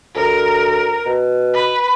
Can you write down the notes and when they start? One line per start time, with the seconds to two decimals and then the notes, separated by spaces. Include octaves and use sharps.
0.15 D2 A#4
1.06 B2
1.54 B4